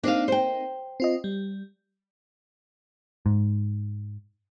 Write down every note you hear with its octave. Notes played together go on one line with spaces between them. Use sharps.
A#3 C4 D4 D#4 F5
C5 G5
C4 F4 D#5
G3
G#2